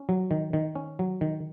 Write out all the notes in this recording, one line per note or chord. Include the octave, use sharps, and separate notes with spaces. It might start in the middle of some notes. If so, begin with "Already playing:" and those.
Already playing: C#4
F#3
D#3
D#3
C#4
F#3
D#3